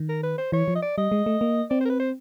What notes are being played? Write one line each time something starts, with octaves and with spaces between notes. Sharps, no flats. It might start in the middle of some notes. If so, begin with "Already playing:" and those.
Already playing: D#3
A#4
B4
C5
E3 C#5
F3
D#5
D5
G3 D#5
G#3
A3
A#3
C4 D5
C5
A#4
B4
C5